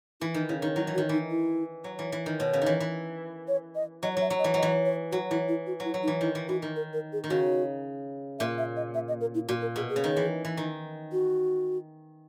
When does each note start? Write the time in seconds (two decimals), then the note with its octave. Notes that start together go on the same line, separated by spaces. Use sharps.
0.21 E3 E4
0.34 D#3 D#4
0.48 C#3 E4
0.62 D#3 D#4
0.75 F#3 E4
0.87 E3
0.94 F#4
0.98 D#3
1.09 E3 D#4
1.31 E4
1.84 F#3
1.99 E3
2.12 E3
2.26 D#3
2.39 B2 C#5
2.53 C#3
2.62 D#3 E3
2.80 E3
3.48 C#5
3.75 D#5
4.03 F#3 D#5
4.17 F#3 E5
4.30 F#3
4.39 D#5
4.44 E3
4.54 F#3 D#5
4.62 E3
4.85 C#5
5.12 F#3 F#4
5.31 E3 E4
5.48 E4
5.67 F#4
5.80 F#3 E4
5.94 F#3
6.03 D#4
6.08 E3
6.21 D#3 E4
6.35 E3
6.48 E3 F#4
6.62 D#3
6.76 A#4
6.93 A#4
7.13 G#4
7.24 D#3
7.30 C#3 F#4
8.39 A#2 E5
8.58 E5
8.76 D#5
8.94 E5
9.08 D#5
9.21 A#4
9.35 E4
9.48 A#2 F#4
9.62 A#4
9.76 B2 G#4
9.89 G#4
9.96 C#3
10.04 D#3
10.17 E3
10.45 E3
10.57 D#3
11.12 F#4